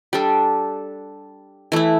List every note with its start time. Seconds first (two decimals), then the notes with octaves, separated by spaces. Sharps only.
0.13 G3 D4 A4
1.72 E3 A3 E4